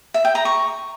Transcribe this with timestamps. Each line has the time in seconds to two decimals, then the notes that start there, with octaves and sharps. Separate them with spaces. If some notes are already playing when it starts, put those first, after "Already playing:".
0.14 E5
0.25 G5
0.35 A#5
0.45 C#6